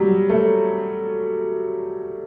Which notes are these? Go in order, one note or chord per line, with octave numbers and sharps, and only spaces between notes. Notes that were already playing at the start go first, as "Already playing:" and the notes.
Already playing: F#3 G3
A3